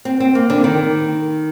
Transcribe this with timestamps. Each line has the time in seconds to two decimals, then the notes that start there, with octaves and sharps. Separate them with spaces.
0.05 C4
0.20 C4
0.35 A#3
0.50 D3
0.64 D#3